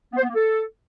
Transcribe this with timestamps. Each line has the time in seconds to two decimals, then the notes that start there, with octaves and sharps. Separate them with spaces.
0.11 B3
0.17 C5
0.23 B3
0.28 A#3
0.34 A4